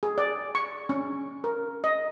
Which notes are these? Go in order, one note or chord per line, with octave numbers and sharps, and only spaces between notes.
G#4
D5
C#6
C#4
A#4
D#5